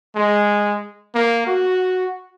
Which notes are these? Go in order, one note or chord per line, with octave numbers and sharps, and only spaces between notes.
G#3
A#3
F#4